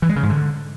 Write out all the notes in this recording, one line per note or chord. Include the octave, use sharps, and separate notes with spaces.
E3
G#3
C#3
G#2
D3